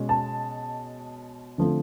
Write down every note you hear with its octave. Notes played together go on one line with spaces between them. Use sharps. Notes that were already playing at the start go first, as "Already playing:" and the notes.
Already playing: B2 G#3 C#4
A5
D3 F3 A3 C4